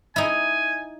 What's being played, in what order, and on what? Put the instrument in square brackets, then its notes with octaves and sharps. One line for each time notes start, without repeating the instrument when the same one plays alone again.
[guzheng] D#4 E4 [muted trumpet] G#5